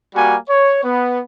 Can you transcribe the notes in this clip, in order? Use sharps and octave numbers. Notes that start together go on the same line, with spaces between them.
G3 A#3 F#4 G#5
C#5
B3